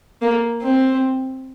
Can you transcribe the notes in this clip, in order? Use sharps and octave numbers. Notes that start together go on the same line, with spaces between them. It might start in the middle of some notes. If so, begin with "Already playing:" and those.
A#3
C4